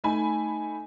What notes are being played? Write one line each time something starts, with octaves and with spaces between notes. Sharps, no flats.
A3 D#4 G#5 B5